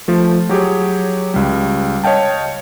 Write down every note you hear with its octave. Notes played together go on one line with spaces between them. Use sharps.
F3 A3
F#3 G4 G#4 C#5
C#2 G3
C#5 D#5 F5 G5 A5